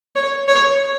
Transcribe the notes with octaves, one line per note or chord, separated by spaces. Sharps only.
C#5
C#5